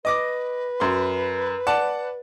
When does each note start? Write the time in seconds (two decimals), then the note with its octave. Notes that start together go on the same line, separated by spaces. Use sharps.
0.05 B4 D#5 D6 A#6
0.80 F#2 C6
1.67 D5 F#5 A5